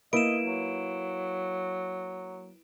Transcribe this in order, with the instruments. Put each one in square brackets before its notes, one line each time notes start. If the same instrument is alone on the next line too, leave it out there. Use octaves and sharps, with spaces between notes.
[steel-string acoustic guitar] A#3 [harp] E4 B4 [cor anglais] D#5 [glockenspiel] D7 E7
[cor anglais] F#3